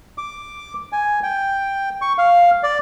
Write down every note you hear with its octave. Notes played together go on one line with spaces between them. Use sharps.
D6
G#5
G5
C#6
F5
D5